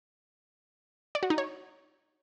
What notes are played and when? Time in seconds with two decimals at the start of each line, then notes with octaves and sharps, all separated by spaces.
1.15 D5
1.23 F#4
1.30 D#4
1.38 C#5